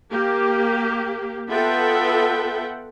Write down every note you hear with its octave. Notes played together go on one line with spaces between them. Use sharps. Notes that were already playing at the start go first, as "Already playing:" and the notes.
A#3 G4
B3 F4 A4 E5 F#5 G5